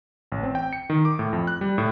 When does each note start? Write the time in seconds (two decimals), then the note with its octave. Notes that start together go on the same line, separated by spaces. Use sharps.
0.32 A1
0.43 C4
0.55 G5
0.73 C#7
0.90 D#3
1.05 D6
1.19 A2
1.33 F2
1.47 F#6
1.61 G3
1.78 A2